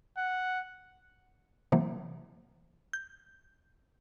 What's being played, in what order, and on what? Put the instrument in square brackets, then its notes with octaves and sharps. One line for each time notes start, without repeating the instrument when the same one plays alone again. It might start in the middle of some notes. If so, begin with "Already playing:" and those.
[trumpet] F#5
[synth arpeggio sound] C3 E3 F#3 A#3
G6